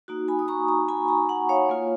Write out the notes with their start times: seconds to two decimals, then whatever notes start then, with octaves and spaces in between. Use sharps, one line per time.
0.08 A#3 D#4 F#4
0.28 G#5 B5
0.39 D#6
0.48 A#5 C#6
0.68 A#5 C#6
0.88 G#5 B5
1.08 A#5 C#6
1.29 F#5 A#5
1.49 C#5 F5
1.69 A#3 F4